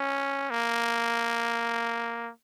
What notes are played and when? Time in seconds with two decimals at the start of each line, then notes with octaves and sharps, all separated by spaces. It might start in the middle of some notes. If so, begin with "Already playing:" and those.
Already playing: C#4
0.51 A#3